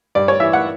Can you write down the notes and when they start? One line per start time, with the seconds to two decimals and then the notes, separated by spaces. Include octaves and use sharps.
0.15 G2 D5
0.28 C#5
0.40 E3 E5
0.53 F#5